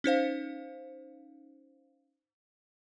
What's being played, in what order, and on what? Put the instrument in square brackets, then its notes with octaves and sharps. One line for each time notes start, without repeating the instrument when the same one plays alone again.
[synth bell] C#4 D#4 C5 F5